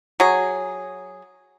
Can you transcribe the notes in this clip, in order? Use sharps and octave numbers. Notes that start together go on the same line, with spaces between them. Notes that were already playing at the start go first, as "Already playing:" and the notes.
F#3 G#4